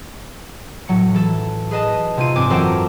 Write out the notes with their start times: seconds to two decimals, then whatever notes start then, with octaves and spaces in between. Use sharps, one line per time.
0.88 A2 F#3 C#7
1.14 E3 A4
1.71 G#4 B4 D#5 A5
2.17 C3 A#3 D#4 F4 D#7
2.36 G#2 C4 D4 G#5 D6
2.49 F#2 E3 A4 A#4 C5 G5